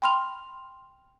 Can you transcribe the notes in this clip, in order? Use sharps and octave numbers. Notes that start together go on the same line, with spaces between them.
G5 B5 C6 F6 F7